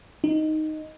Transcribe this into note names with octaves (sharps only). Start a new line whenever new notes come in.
D#4